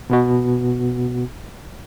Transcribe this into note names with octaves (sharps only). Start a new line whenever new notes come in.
B2 B3 F#4